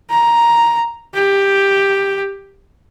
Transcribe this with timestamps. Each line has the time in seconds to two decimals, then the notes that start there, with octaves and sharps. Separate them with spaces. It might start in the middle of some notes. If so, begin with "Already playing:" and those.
0.10 A#5
1.14 G4